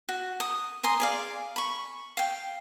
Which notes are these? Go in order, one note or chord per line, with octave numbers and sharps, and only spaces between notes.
F#4
D#6
G#5 A#5 C6 D#6
G#4 D5 F5
B5 C#6
F5 G5